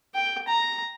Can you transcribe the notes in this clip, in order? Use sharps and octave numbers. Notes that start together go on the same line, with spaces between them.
G5
A#5